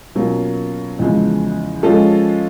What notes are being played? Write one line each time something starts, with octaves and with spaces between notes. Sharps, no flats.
B2 F#3 A#3 C#4 F4
E2 C#3 F3 G#3
F3 G#3 C#4 F4 A4